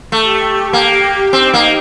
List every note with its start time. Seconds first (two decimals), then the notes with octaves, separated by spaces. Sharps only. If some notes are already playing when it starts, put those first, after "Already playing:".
0.12 A3 G4
0.73 A#3
1.33 C4 D#4
1.54 A#3